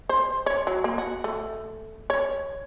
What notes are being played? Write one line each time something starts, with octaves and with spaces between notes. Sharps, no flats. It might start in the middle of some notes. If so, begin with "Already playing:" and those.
C5
C#5
F#3
A#3
F#4
A3
C#5